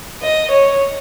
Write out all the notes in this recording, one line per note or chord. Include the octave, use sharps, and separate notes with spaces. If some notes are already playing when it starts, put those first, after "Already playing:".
D#5
C#5